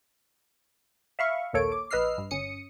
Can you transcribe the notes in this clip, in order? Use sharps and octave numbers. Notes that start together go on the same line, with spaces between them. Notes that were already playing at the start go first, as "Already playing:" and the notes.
E5 F5 B5 C#6
A#1 D#2 A#3 A4 C#5 D7
D6
A#1 B4 D#5 E6 F6 C7
G2
G1 C#4 D#6 C#7